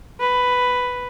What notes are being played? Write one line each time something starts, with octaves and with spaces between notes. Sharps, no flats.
B4